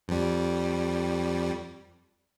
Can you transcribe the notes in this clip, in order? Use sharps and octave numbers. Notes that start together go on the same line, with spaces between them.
F2 G3